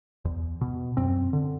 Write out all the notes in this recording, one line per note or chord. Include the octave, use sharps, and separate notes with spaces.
E2
B2
F#2 C4
D3